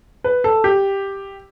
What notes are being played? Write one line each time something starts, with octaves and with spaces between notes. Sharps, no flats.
B4
A4
G4